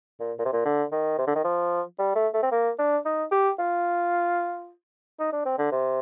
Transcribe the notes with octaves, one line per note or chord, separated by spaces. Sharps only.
A#2
A#2
C3
A#2
D3
D#3
C3
D3
D#3
F3
G3
A3
A3
C4
A#3
D4
D#4
G4
F4
D#4
D4
C4
D3
C3